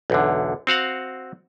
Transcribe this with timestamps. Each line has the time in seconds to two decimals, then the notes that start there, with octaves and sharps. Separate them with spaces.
0.10 B1 E2 D3
0.67 C4 F#4 F5 F#5